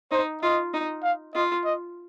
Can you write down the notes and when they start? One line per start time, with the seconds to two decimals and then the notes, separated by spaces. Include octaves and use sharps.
0.11 D#4 C5
0.42 F4 D#5
0.73 D#4
1.03 F5
1.34 F4 D#5
1.65 D#5